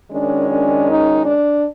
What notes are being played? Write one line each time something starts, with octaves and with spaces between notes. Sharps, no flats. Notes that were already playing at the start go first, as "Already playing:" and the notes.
F#2 D#3 G#3 C#4 D4
D4
D#4
D4